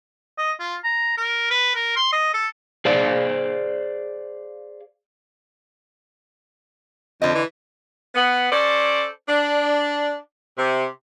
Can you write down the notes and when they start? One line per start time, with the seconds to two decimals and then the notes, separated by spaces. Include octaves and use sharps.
0.38 D#5
0.60 F4
0.84 A#5
1.18 A#4
1.51 B4
1.75 A#4
1.96 C6
2.12 D#5
2.34 A4
2.85 G#4 C5 D5 F5
7.22 F2 D3 D#5
7.34 E3
8.15 B3
8.52 C#4 A4 C5 D5
9.29 D4
10.58 C3